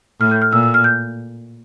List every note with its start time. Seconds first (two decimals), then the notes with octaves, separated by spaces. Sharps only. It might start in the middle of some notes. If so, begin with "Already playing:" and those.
0.21 A2 F6
0.31 G6
0.42 F6
0.52 A#2 E6
0.63 E6
0.74 F6
0.84 G6